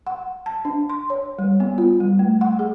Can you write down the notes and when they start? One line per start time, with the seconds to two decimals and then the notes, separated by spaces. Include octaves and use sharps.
0.07 F#5
0.46 A5
0.65 D4
0.89 C6
1.10 C#5
1.39 G3
1.60 B3
1.78 F4
2.00 G3
2.19 A3
2.41 F#5
2.59 G#4